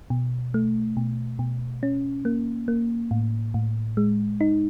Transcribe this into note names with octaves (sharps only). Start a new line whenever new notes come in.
B2
A3
B2
B2
C#4
A#3
A#3
A2
A2
G#3
D#4